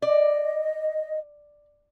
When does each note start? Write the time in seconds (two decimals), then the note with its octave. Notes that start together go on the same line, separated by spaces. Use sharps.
0.02 D5 D#5